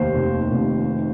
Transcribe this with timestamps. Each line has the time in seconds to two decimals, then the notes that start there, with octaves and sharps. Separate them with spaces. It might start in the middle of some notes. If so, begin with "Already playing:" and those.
Already playing: F1 D#2 C5
0.15 F1
0.51 F1